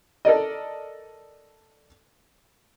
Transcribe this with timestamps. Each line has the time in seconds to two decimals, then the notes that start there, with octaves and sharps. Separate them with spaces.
0.25 A4 A#4 D5 D#5